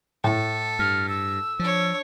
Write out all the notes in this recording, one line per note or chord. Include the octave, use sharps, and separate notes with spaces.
A2 A4
G2 F6
E6
F3 D4 C#5